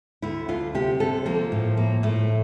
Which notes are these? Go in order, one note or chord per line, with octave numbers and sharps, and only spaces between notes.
D2 E4
D2 F4
C3 G4
D2 A4
F3 A#3
A2
F3 A#3
A2 A3